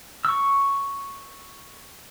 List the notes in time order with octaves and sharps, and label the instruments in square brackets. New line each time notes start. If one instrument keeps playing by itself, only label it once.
[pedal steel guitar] C#6 E6